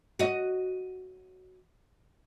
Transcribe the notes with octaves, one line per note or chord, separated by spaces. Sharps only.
F#4 D#5